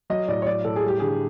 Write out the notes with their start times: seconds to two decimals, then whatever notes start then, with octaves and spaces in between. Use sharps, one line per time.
0.10 F#3 D#5
0.28 A2 D5
0.42 C#5
0.47 F#3 D5
0.65 A2 A4
0.76 G#4
0.84 G3 G4
1.00 D3 G#4